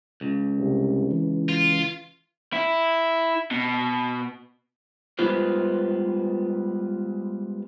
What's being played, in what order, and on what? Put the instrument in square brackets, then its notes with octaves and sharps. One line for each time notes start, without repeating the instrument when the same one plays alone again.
[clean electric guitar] C#2
[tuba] C2
E3
[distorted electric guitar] F4
[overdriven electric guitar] E4
B2
[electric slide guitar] G3 G#3 B3 F4 B4 C5